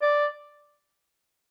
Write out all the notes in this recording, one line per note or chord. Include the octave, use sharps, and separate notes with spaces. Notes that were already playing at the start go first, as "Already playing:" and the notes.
D5